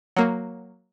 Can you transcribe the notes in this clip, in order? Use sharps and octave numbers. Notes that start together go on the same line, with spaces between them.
F#3 A#3